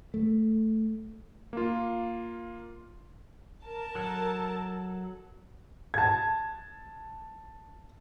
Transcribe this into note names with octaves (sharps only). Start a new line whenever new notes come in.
A3
A#3 F4
A#4 A5
F#3 A4
A5 G#6